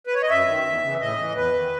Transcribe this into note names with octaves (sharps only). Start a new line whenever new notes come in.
B4
C#5
D#5
F#2 E5
D#3
E2
C#3 E3
A2 D#5
E3
E2 B4
D#3